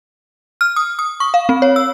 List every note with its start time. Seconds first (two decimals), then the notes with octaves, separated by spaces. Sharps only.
0.61 F6
0.76 D#6
0.99 D#6
1.20 C#6
1.34 F5
1.49 C4
1.62 C#5
1.76 E6